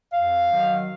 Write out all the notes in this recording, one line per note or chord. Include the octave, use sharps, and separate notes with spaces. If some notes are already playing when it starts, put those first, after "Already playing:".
F2 F5
D#3 F#3